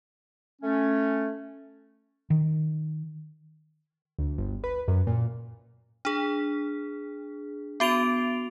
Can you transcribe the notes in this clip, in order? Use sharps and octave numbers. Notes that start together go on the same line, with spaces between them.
A3 C#4
D#3
D2
G1
B4
F#2
A#2
D4 G#4
B3 F#4 D7 F7